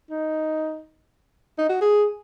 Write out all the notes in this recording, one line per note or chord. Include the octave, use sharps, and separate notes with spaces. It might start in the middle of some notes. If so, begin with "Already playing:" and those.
D#4
D#4
F#4
G#4